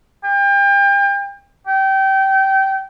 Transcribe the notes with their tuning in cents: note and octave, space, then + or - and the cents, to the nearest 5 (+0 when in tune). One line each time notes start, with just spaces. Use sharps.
G5 +35
G5 -25